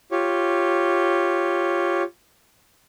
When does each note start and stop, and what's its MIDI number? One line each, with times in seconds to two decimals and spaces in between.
0.11 2.03 65
0.11 2.03 67
0.11 2.03 73